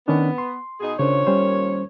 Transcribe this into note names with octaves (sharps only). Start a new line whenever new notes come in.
D#3 B3 C#4 D4
C6
B2 D#4 G#4
D#2 A#2 C#3 D4 C5 C#5
G3 C#4 C5